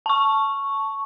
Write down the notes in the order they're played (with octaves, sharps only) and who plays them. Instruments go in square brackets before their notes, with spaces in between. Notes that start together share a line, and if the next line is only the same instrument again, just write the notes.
[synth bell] A5 C#6